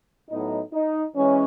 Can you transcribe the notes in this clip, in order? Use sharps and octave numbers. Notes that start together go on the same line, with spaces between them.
A2 F#3 B3 D#4
D#4
E3 G#3 C#4